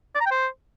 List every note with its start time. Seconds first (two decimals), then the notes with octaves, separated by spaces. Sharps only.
0.15 D5
0.21 A#5
0.26 G5
0.31 C5